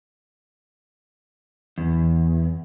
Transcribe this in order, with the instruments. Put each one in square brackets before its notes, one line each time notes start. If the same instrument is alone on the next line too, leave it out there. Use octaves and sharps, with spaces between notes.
[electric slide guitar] E2